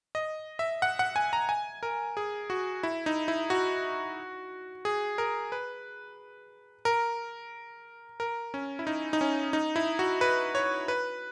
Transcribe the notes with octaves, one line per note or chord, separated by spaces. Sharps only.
D#5
E5
F#5
F#5
G#5
A#5
G#5
A#4
G#4
F#4
E4
D#4
E4
F#4
G#4
A#4
B4
A#4
A#4
C#4
E4
D#4
D#4
C#4
D#4
E4
F#4
B4
C#5
B4